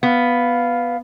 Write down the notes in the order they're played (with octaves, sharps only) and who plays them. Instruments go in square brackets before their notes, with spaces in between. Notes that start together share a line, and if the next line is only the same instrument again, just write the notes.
[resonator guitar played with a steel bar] B3 [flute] F5